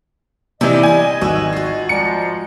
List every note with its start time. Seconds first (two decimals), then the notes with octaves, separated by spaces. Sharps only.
0.61 C3 E3 G3 E4 D#5
0.83 G#5
1.21 G#1 F#4 E6
1.53 F4 F#4
1.89 F3 G3 G#3 D5 G#5 A#5 C#7